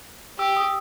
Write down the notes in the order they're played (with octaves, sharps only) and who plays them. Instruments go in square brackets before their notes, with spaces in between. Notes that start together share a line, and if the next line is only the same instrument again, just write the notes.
[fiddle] G4 [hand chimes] E6
[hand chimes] D#6